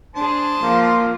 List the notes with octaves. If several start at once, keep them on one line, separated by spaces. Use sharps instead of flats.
D4 G#4 C5 A5
F3 A#3 F4